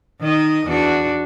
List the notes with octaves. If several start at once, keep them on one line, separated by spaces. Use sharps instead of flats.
D#3 D#5
E2 D4 F#4